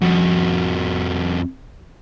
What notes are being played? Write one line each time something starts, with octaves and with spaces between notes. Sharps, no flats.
F2 F#4